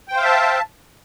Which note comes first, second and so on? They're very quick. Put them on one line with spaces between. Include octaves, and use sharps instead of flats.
G5 C5 F5 E5 A5